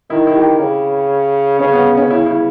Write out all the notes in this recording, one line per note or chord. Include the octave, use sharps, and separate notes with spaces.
D#3 E4
E4
G4
C#3
C#3 C#4
B3
C#4
C#3 E4
E4